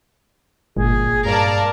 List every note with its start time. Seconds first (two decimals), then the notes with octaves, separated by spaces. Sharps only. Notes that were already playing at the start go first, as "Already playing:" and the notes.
0.77 G1 A#2 G#3 G#4
1.26 G2 A#4 D5 F5 A5